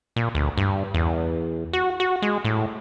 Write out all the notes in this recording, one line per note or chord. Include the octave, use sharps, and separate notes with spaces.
A#2
D2
G2
E2
F#4
F#4
G#3
A2